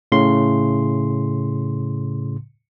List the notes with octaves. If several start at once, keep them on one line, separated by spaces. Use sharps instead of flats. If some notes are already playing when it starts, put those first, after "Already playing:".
A2 C#3 C6